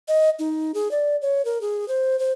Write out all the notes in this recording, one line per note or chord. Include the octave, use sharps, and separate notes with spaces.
D#5
D#4
G#4
D5
C#5
A#4
G#4
C5
C5